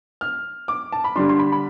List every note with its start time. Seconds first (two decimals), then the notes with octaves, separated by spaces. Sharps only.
0.21 F6
0.68 D6
0.92 A5
1.04 B5
1.15 D3 G3 D4 C6
1.29 C6
1.39 B5
1.52 B5